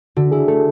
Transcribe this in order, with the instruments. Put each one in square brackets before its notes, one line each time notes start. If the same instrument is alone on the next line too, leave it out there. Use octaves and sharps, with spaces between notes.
[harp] D3 [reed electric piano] F#4
[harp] E4 [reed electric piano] G#4
[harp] A3 [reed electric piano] A4